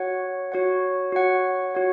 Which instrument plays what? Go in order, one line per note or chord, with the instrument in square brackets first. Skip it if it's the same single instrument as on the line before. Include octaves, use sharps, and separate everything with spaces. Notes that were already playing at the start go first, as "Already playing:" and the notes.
Already playing: [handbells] F#4 C#5 F#5
F#4 C#5 F#5
F#4 C#5 F#5
F#4 C#5 F#5